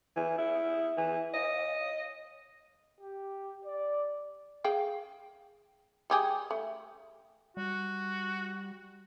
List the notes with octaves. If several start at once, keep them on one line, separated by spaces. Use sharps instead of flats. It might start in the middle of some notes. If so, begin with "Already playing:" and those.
E3
E4
E3
D#5
G4
D5
G#4 F5 G5
G3 G4 G#4
A3
G3 F#4